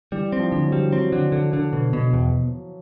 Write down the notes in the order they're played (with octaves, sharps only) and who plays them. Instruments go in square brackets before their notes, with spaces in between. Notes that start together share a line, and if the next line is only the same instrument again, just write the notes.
[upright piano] E3 [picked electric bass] G3
[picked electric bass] C4
[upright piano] F3
[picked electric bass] D3 [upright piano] F3
[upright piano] F#3
[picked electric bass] G3
[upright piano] F#3 [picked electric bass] C4
[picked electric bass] D3
D3
D3
B2
B2
E2